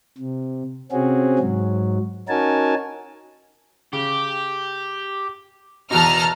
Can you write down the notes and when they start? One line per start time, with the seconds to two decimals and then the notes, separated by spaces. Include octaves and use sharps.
0.18 C3
0.92 C3 C4 C#4 F#4 G#4
1.39 G#2 F#3
2.28 C#4 D#4 F#4 A#4 G#5 A5
3.93 C#3 G4
5.91 E2 B2 D#4 A#4 A5 A#5 F6